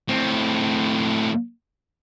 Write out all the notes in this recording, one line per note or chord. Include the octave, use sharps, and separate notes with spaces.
A2 C4